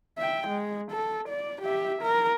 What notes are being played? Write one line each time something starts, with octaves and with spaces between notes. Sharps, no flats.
E5 G5
G#3
A4
D5
G4 E5
A#4